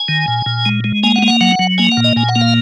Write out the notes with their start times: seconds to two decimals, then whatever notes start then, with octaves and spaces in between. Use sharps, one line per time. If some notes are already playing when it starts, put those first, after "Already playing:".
Already playing: G#5
0.08 D#3
0.28 A#2
0.46 A#2
0.66 G#3
0.84 G#3
1.03 A#3 G#5
1.16 F#5
1.22 A#3
1.28 F#5
1.41 F#3 F#5
1.59 F#3
1.78 A#3 G#5
1.92 F#5
1.97 A#2
2.04 D#5
2.16 A#2 G#5
2.29 F#5
2.35 A#3
2.41 F5